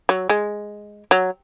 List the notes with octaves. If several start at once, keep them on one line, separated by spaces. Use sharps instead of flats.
F#3
G#3
F#3